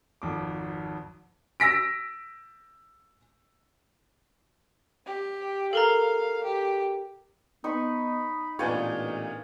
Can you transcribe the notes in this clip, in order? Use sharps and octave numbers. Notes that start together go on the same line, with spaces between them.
G#1 F2 D6
E6 A#6 B6 D7
G4
A4 A#4 F5 A#5
G4
B3 D#4 B5 C#6
A1 A#2 B3 D4 C#5 F5 G#5 G6